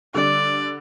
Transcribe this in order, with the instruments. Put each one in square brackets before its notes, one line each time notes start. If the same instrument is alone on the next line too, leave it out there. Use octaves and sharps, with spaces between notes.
[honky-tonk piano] D3 G3 [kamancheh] D5